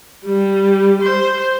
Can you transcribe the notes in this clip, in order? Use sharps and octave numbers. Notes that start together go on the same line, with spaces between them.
G3
C5